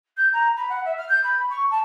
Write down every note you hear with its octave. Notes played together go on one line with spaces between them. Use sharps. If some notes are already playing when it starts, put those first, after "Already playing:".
G6
A#5
B5
F#5
E5
F6
G6
B5
C#6
A5